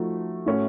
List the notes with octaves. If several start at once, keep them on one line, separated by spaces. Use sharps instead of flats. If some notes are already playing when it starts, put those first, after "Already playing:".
Already playing: F3 A3 D#4 F#4
A2 A3 C#4 F#4